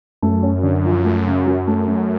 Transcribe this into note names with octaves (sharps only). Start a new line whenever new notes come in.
F#2 A3
C#4
D3
F3
A3
C#3
F#3
A3
A3